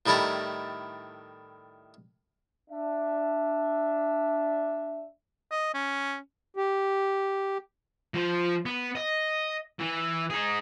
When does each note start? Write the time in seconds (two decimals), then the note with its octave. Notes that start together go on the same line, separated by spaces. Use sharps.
0.06 A2 D#3 G3 E4 A5 A#5
2.70 D4 E5
5.51 D#5
5.74 C#4
6.57 G4
8.14 F3 C5
8.66 B3
8.95 D#5
9.79 E3
10.30 D#4 G#4